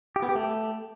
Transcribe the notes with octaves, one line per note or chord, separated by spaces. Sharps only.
G4
B3
G4
A3